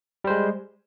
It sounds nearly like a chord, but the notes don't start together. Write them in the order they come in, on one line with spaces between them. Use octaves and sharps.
G3 C5 G#3